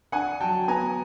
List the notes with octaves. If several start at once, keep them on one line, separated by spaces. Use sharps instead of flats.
D4 F#5 G#5
F#3 G5 A5
B3 G#5 A#5